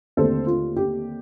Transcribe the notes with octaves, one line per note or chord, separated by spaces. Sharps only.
D#2 D3 A3 C4 A4 C5
F4
G4